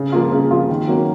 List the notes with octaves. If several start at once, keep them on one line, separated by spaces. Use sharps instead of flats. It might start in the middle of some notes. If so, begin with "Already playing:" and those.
Already playing: C#3
F3 A#3 F4
C#3
F3 A#3 F4
D#3
F#3 A#3 C#4 F#4